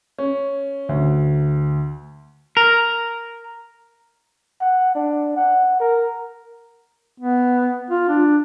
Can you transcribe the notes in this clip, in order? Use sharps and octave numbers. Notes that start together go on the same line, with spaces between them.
C#4
D2
A#4
F#5
D4
F#5
A#4
B3
F4
D4